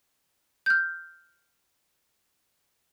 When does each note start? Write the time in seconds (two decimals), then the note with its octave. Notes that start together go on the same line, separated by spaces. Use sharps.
0.66 F6 G6